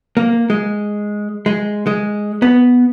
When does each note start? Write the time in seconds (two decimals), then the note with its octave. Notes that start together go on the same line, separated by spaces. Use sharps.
0.17 A#3
0.50 G#3
1.46 G#3
1.87 G#3
2.42 B3